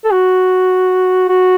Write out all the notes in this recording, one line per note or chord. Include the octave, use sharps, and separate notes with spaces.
A4
F#4
F#4